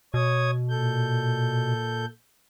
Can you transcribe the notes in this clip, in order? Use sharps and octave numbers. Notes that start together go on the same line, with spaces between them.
B2 C#5 D#6 G#6
A#2 A4 G6